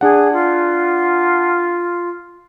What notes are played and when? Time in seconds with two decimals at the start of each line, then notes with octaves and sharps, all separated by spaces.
0.01 D4 G#4 F#5
0.33 F4